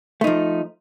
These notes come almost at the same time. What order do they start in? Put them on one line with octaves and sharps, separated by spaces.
A3 D#4 F3